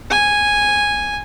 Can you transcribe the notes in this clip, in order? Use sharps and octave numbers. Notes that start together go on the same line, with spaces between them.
G#5